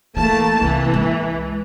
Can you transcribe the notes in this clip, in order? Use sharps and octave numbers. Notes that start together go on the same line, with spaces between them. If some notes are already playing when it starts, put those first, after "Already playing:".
E3 A3 A#3 A5
C2 E3
G#3